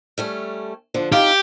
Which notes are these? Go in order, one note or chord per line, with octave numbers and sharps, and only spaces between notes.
G3 A3 C#4
D3 F3 D4
F2 D#4 G4 F5